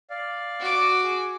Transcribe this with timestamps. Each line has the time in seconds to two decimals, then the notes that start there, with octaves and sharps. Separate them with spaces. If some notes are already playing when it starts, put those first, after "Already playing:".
0.10 D5 F5
0.60 F#4 D6
1.04 G#4